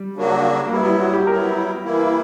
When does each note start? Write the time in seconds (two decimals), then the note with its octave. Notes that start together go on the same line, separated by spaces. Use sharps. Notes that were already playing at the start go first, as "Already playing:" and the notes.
Already playing: G3
0.16 C#3 F#3 A#3 D4 F#4
0.67 A#3
0.71 F#3 G3 B3 E4
0.86 G3
0.99 F#4
1.13 G4
1.27 F#3 B3 E4 A#4
1.84 E3 A#3 E4